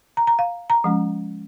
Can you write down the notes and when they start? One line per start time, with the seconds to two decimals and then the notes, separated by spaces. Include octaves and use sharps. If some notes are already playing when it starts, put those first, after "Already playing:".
0.17 A#5
0.27 A#5
0.39 F5
0.70 A#5
0.84 F3 G#3 C#4